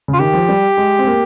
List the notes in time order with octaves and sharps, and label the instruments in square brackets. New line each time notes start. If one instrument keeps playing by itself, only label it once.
[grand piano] C#3
[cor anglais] F4
[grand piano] D#3 [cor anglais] G4
[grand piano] F3
G3
G#3
C4
A#3